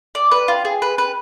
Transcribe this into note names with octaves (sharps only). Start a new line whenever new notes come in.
D5
B4
F4
G#4
B4
B4